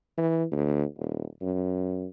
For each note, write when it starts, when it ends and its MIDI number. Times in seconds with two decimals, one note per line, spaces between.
0.18 0.44 52
0.52 0.84 38
0.98 1.26 27
1.42 2.05 42